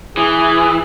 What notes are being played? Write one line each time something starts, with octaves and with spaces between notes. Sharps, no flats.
E3 G#4